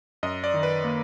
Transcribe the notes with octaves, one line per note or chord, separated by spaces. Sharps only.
F#2 D#5
D5
D#3
B4
A#3